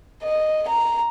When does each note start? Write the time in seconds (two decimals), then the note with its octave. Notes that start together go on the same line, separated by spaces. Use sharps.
0.23 D#5
0.68 A#5